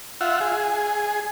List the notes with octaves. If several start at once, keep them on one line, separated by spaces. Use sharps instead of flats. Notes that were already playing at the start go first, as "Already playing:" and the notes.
F4 E5 F#5
G#4